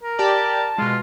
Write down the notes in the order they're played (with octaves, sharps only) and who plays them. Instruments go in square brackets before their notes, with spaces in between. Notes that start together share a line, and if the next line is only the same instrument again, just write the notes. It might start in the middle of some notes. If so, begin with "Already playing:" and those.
[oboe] A#4
[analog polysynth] G4 D5 [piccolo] A5
[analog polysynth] B2 G#3 [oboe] F4